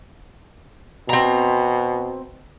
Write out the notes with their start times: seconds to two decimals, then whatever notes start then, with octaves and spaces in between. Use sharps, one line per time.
1.09 B2 C4 A#5